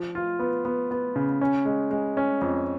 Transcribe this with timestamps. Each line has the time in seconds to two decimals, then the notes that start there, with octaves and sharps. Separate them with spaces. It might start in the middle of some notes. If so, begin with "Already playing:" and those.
Already playing: F3
0.15 F4
0.39 B3
0.65 B3
0.91 B3
1.16 C#3
1.41 C#4
1.65 G#3
1.91 G#3
2.17 C#4
2.41 F2